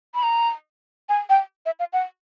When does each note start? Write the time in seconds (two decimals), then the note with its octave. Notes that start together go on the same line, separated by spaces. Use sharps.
0.14 B5
0.23 A#5
1.09 G#5
1.29 G5
1.66 E5
1.79 F5
1.93 F#5